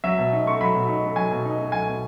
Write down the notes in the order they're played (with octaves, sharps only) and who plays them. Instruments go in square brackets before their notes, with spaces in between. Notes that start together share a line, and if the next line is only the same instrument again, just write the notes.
[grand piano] F#3 E5
B2
D#4
A3 C#6
F#3 B5
B2
D#4
A3
F#3 G#5
B2
D#4
A3
F#3 G#5
B2